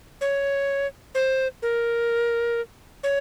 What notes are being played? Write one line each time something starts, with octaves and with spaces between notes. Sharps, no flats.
C#5
C5
A#4
C#5